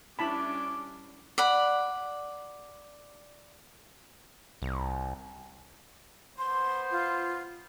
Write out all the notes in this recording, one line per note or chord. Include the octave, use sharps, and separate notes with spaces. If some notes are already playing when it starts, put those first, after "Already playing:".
G3 C#4 D4 E4 A5 B5 D6
D5 F#5 B5
C2
B3 C5 C6
F4